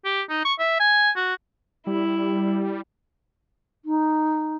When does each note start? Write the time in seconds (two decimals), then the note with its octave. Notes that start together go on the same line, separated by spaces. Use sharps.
0.05 G4
0.29 D#4
0.45 C#6
0.59 E5
0.80 G#5
1.16 F#4
1.87 G3 E4
3.85 D#4